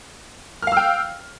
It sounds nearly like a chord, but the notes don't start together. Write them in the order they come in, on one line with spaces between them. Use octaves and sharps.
F6 F5 E6 G5